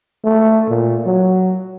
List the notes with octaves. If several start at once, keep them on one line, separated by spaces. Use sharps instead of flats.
A3
A#2
F#3